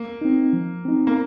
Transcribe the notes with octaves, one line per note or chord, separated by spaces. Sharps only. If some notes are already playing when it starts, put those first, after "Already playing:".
Already playing: A#3
C4 D#4
F3
C4 D#4
A#3